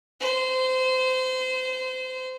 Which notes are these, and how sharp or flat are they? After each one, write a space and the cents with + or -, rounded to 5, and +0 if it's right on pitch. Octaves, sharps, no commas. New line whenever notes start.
C5 -25